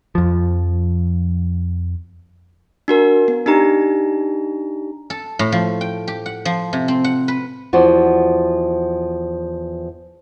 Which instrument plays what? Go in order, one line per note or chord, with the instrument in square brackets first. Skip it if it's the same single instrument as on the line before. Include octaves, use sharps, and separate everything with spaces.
[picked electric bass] F2 F3
[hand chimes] D4 F#4 A#4
B3
D4 D#4 G4 A#5
[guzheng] A4
A2
F3
G5
G4
F#5
F3
C3
C4
F#5
B4
[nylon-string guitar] E2 F3 F#4 D5